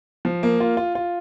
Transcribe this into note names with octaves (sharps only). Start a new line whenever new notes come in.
F3
A#3
F4
F4
F4